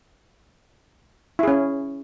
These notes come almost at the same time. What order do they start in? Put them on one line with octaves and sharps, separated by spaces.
E4 G#4 C#4